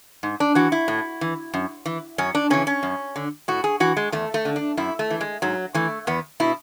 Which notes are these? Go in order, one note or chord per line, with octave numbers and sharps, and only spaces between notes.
G#2
D4
E3 F#4
E4
A2
E3
F#2
E3
F#2 C#4
D4
C#3 E3 C#4
C#4
F#2
D3
A2 F#4
G#4
E3 F#4
G#3
E2 A3
A3
D3
D4
F#2 E4
A3
E3
G#3
G#2 F#3
E3 A3
E2 B3
B2 E4